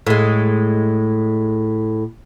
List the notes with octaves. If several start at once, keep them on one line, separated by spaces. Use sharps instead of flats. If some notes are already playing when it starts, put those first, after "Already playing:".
A2 G#3